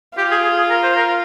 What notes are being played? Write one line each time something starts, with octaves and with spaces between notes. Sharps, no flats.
F4 G4
G#4
G#4
G#4
A#4
C5
A#4